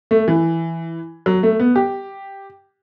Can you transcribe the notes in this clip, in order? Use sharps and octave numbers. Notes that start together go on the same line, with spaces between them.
A3
E3
F#3
A3
B3
G4